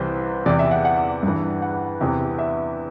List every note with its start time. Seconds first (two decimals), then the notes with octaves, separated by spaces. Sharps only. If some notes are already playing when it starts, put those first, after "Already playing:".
Already playing: C2 C3 E3 C5
0.46 E2 C3 E3 D5
0.59 E5
0.71 F#5
0.85 F#5
1.23 G2
1.28 E3
1.62 F#5
2.01 E2 C3 E3
2.39 E5